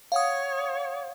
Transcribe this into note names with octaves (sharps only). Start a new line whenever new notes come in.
C#5 F5 F#5 D#6